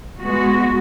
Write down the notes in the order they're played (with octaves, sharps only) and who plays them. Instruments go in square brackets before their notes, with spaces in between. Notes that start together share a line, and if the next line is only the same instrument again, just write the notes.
[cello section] G#3 B3 F#4